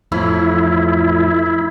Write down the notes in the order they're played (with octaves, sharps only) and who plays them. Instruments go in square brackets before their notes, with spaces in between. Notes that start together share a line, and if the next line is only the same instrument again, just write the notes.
[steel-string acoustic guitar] F2 A2 E3 [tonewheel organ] E4